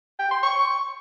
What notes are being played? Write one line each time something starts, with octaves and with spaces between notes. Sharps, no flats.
G5
C6
C#6